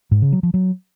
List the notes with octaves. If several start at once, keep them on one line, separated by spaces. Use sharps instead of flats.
G#2
C#3
F#3
F3
F#3